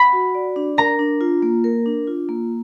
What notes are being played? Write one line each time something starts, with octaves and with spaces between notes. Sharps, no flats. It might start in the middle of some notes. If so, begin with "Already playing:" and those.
Already playing: F#5 B5
F#4
D5
D4
A#4 A#5
D4
F4
A#3
A#4
D4
F4
A#3